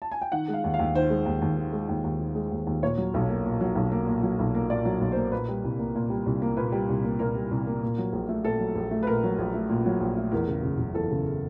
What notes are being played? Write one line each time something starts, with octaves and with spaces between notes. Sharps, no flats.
A5
G#5
G5
D#3 F#5
G#3
F5
D#2
F5
D#2
D#3 C5
G#3
D#2
D#2
D#3
G#3
D#2
D#2
D#3
G#3
D#2
D#2
A#2 C#5
F#3
B1
A#3
A#2
F#3
B1
A#3
A#2
F#3
B1
A#3
A#2 D5
F#3
B1
A#3 C5
A#2 B4
G3
C2
A#3
A#2
G3
C2
A#3
A#2 B4
G3
C2
A#3
A#2 A#4
G3
C2
A#3
A#2
F#3
A#1
A3
A#2 A4
F#3
A#1
A3
B4
A#2 A#4
F#3
A#1
A3
A#2
F#3
A#1
A3
E2 A#4
C#3
F#1
F#1
E2 A4
C#3